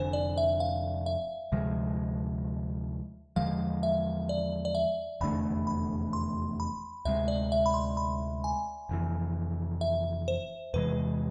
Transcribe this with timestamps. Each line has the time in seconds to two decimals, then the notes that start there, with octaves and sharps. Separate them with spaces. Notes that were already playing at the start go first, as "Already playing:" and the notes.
Already playing: F1 F2 D3 C5 G#5
0.13 D5
0.38 E5
0.60 F5
1.06 E5
1.52 D2 C3 F3 G#3
3.36 E2 D3 F3 G#3 F5
3.83 E5
4.29 D5
4.65 D5
4.75 E5
5.21 F1 E2 D3 A3 B5
5.67 B5
6.13 C6
6.60 B5
7.05 D2 C3 G#3 E5
7.28 D5
7.52 E5
7.66 B5
7.74 C6
7.97 B5
8.44 G#5
8.89 F1 F2 E3
9.81 E5
10.28 C5
10.74 E2 C3 E3 G#3 B4